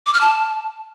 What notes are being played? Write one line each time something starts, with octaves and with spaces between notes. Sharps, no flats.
D6
F6
A5